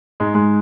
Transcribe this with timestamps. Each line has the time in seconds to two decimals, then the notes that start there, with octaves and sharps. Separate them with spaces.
0.20 G#2 G#3
0.34 G#2 G#3